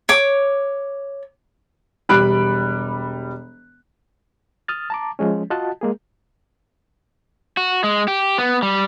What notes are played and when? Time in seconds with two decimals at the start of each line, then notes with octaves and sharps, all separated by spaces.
0.09 C#5 D6
2.09 E1 G3 B5 F#6 D7
4.68 D#6 F6 A6
4.90 A5 A#5 D6
5.19 F3 G#3 C#4
5.50 F4 F#4 D#5 F#5 A5
5.81 G#3 A#3 G#4
7.57 F#4
7.84 G#3
8.08 G4
8.38 B3
8.62 G3